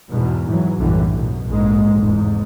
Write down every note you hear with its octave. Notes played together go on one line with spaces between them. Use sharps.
E2 G#2 B2
G#2 E3 F#3
B1 F#2 A2 D3 E3 G3
F#2 B2
A#1 F2 G#2 G#3
F1 E2 G#2